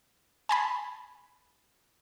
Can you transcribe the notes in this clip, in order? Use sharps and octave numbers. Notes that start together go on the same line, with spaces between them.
G#5 A5 B5